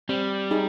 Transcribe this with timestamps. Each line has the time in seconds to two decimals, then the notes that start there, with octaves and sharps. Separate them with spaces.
0.09 G3 C4
0.51 D#4 G#4